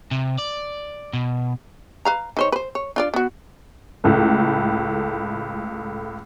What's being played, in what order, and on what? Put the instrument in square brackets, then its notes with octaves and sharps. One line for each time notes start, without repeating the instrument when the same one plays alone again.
[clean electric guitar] C3
D5
B2
[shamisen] B4 F5 A#5
D#3 C5 C#5
B4 C5
C#5
D4 F4 D5
B3 F#4
[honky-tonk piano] C#2 A2 A3